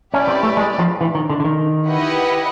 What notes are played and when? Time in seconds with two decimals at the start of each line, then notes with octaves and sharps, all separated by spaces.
0.14 C#4 E4 G4 B4 D5
0.28 C4
0.43 A3
0.57 G#3
0.79 F3
1.01 E3
1.15 D#3
1.30 D3
1.40 D3
1.45 D#3
1.87 E4 G4 B4 D#5 F#5